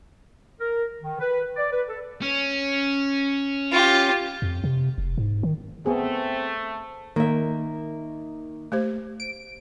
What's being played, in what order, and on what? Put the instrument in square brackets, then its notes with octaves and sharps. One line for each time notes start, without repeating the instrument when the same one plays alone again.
[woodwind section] A#4
D#3
B4
D5
B4
A4
[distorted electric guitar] C#4
[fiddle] F4 G4
[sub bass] F2
C3
F1
G#2
D#3
[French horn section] A3 [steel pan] B3 G#4 [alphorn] C4
[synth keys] D#3 [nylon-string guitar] A#3 E5
[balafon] A3 G4 C5
[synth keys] D7